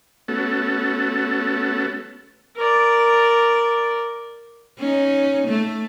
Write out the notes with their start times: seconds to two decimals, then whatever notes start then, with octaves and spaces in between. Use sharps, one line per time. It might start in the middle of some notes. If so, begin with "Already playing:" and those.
0.28 A3 B3 C#4 F#4 A4
2.56 A#4 D5
4.79 C#4 D#4
5.48 A3